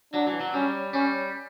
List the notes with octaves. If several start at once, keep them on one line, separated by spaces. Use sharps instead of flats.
F#3 D4
E3
F#3
G3 C#4
G3 C#4